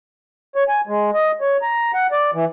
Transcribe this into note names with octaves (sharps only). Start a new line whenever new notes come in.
C#5
G#5
G#3
D#5
C#5
A#5
F#5
D5
E3